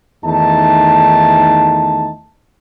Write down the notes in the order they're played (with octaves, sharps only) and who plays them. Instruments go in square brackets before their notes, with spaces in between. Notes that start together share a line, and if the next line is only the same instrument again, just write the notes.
[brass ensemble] E2 D#3 A3 D#4 A5